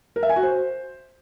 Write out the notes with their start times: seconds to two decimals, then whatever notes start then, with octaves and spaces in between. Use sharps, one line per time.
0.16 A#4
0.23 E5
0.29 G#5
0.36 F#4
0.43 C5